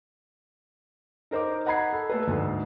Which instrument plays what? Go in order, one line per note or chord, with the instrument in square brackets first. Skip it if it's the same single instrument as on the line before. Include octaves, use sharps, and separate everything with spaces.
[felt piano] D#4 A#4 C5 D#5 D6
D#5 F#5 A#5 B5 G#6 C7
A4
A3 A4 B4
D2 G#2